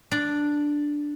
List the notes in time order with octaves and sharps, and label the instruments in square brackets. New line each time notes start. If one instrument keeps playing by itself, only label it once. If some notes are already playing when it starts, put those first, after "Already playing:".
[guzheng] D4 D5